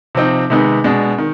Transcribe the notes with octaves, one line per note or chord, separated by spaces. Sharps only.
C3 F3 C4 D#4
C3 D#3 G#3 B3 D#4
B2 G#3 D4
D#3